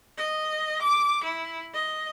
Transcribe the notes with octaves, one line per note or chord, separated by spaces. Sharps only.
D#5
D6
E4
D#5